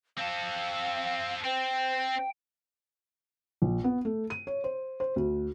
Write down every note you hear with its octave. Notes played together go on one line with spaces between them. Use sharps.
C4 A4 F5
C4 C5 G5
A#1
B3
A3
D#7
C#5
C5
C5
D2